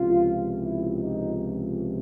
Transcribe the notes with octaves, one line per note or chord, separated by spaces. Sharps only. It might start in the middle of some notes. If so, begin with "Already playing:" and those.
Already playing: C#2 C3 F3 F4
E4
D#4